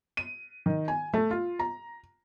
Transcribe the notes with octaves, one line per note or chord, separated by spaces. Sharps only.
D#7
D#3
G#5
A3
F4
A#5